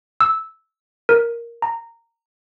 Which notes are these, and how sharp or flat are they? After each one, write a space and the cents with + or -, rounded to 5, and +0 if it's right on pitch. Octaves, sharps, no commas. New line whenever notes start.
E6 -10
A#4 +5
A#5 -15